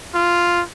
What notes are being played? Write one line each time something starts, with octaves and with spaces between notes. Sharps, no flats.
F4